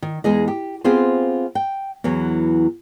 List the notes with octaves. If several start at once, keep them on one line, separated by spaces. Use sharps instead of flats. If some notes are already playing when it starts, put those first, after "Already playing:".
D#3
E2 G#3 G#4 D#5
G4
B3 C4 F4 G4 G#4 C5
G5
E2 E3 F#3